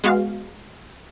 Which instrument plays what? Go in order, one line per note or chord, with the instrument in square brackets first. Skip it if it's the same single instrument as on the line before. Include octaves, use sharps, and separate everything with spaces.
[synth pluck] G#3 B3 F#4 F5